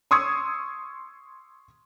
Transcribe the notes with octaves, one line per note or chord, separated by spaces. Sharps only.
C6 C#6 D#6 E6 G#6 C#7